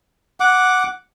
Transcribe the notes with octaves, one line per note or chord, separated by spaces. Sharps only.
F#5 D6